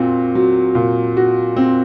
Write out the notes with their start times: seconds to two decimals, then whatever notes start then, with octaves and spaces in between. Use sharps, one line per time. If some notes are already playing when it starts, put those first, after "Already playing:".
Already playing: A#2 C4 F#4
0.35 F#3
0.75 A#2
1.17 F#4
1.56 C4